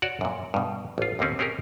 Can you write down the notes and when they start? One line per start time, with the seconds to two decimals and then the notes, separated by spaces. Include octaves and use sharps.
0.02 F#4 C#5 D5 F#5
0.21 F#2 A#2
0.54 G2 B2
0.98 A1 F4
1.19 D#2 D3 A#3 C4 C#4
1.39 C4 C#4 G4 G#4 A#4